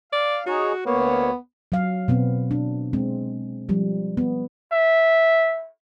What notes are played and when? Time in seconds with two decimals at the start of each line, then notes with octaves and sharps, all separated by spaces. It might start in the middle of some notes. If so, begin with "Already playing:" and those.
0.13 D5 F5
0.46 D#4 F#4 G#4 C#5
0.86 D2 A#3 B3 C#5
1.72 F#3 F5
2.08 B2 B3 C4
2.51 D4
2.93 G#3 C4
3.69 F3 G3
4.17 B3
4.72 E5